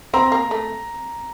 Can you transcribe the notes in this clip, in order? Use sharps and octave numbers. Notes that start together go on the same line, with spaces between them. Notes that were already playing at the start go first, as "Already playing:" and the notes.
C4 A#5
A#3
A3